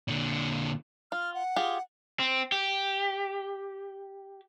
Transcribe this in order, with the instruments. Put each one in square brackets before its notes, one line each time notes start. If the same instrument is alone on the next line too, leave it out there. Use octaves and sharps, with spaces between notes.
[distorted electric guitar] A#2 D3
[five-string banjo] F4 [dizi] F6
[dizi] F#5
[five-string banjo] F4 G4 G#4
[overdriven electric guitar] C4
G4